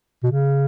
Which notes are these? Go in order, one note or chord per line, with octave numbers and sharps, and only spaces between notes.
B2
C#3